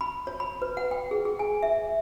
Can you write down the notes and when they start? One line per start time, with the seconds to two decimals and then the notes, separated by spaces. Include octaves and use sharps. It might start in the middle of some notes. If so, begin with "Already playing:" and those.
0.01 B5
0.27 C#5
0.40 B5
0.62 B4
0.77 F#5
0.91 G5
1.11 G#4
1.25 G#4
1.39 G#5
1.63 E5